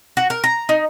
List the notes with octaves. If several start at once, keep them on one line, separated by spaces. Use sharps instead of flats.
F#4
A#4
A#5
D#4